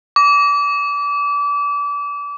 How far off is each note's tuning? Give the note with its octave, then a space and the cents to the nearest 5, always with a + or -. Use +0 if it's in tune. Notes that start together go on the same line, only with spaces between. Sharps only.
D6 -30